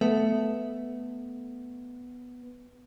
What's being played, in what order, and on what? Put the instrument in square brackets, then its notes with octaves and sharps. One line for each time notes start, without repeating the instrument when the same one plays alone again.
[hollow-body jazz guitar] A3 [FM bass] B3